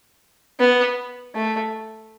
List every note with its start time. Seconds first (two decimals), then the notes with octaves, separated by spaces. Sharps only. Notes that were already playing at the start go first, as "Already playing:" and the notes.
0.59 B3
1.35 A3